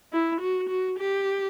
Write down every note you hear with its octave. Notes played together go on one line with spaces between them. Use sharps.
E4
F#4
F#4
G4